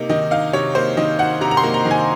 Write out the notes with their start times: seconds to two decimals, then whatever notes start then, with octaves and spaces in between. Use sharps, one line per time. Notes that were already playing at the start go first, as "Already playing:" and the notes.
Already playing: C3 A#3 D#4
0.10 D#3 D#5
0.31 D#4 F5
0.53 C3 C#5
0.75 A#3 C5
0.97 D#3 D#5
1.19 D#4 F#5
1.41 C3 A#5
1.51 A#5
1.57 C6
1.63 A#3
1.74 A#5
1.85 D#3
1.91 G#5